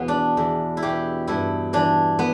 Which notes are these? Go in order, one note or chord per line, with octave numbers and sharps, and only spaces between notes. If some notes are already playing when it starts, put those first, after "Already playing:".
Already playing: E2 B2 B3
D4
E2
E4
B2 G4
G2 E4
E3 D4
B3